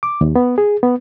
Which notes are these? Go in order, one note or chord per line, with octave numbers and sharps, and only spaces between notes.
D6
D#2
B3
G#4
B3